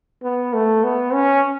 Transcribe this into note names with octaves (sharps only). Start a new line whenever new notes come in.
B3
A3
B3
C#4